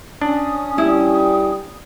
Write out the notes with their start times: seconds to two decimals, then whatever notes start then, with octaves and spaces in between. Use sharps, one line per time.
0.22 C#4 D4 D#6
0.78 G3 E4